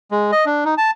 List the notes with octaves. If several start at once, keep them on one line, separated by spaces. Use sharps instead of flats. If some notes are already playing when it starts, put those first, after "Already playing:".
G#3
D#5
D4
D#4
A5